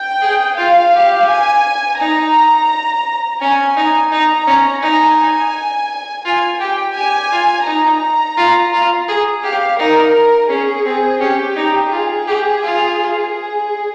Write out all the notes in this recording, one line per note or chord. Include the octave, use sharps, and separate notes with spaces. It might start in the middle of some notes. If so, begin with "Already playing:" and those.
Already playing: G5
G#4
F4 F5
G4
G#5
D#4 A#5
C#4 G#5
D#4 G#5
D#4 A#5
C#4
D#4 G#5
F4 G#5
G4 G5
G4 G#5
F4
D#4 A#5
F4
F4
G#4
G4 F5
D#4 A#4
C#4 G#4
C4
C#4 G4
D#4
F4 G#4
G4
F4
G#4